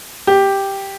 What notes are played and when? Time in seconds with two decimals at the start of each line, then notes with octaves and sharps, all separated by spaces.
0.27 G4